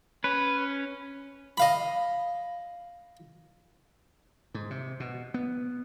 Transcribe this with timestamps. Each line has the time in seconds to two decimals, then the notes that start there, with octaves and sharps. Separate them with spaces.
0.24 C#4 B4
1.58 D#5 F5 B5
4.54 G#2
4.70 C3
5.00 B2
5.34 B3